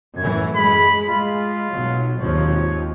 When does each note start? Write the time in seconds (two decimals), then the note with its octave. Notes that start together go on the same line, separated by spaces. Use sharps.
0.18 F#2 A2 E3 G#6
0.56 G#3 B5
1.09 G#3 F4
1.71 B1 F#3
2.20 G#1 D#2 F3 C#5